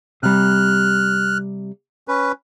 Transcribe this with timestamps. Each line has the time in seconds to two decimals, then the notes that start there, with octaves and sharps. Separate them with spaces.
0.23 C3 G3 F6 F#6
2.08 C#4 B4